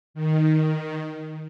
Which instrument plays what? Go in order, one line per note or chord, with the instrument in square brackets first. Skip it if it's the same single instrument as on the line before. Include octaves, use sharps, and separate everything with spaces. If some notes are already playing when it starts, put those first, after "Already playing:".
[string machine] D#3